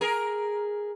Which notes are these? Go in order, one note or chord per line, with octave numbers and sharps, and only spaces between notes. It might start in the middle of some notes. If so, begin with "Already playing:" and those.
G#4 A#4